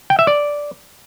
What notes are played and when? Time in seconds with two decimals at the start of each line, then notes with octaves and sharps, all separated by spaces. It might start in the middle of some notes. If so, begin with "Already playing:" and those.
0.10 G5
0.19 E5
0.27 D5